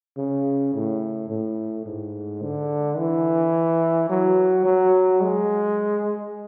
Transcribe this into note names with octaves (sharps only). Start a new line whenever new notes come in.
C#3
A2
A2
G#2
D3
E3
F#3
F#3
G#3